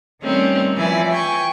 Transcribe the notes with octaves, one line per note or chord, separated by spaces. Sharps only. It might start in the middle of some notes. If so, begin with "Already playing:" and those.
D#3 G3 A3 C4 C#4 D#4
E3 F3 E4 D5 G#5
G5 G#5 C#6